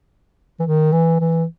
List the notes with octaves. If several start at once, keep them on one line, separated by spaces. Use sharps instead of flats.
E3
D#3
E3
E3